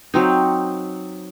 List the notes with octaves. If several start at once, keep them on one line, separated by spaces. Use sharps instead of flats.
F#3 C4 D#4